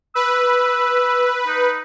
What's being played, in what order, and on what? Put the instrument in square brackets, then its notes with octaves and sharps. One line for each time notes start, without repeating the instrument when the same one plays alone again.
[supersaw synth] B4 [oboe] E6
[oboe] D#4